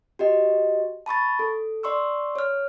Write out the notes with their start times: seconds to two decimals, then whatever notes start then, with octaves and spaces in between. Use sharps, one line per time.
0.19 F#4 G4 D#5
1.06 A5 B5 C#6 A6
1.39 A4
1.83 D5 C6 C#6 E6
2.36 C#5 F6